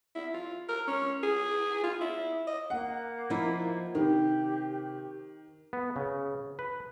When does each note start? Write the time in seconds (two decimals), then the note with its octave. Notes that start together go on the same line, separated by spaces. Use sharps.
0.15 E4
0.34 F4
0.69 A#4
0.88 C#4
1.23 G#4
1.83 F4
2.01 E4
2.47 D#5
2.70 A#3 F#5
3.30 F3 D#4 E4
3.95 C3 D#3 G4
5.73 B3
5.96 C#3
6.59 B4